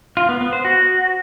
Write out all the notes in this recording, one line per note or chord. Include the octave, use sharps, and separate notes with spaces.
F4
B3
B3
C5
F#4